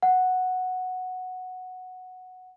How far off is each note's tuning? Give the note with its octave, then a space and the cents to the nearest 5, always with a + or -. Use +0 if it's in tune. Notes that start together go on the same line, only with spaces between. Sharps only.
F#5 -5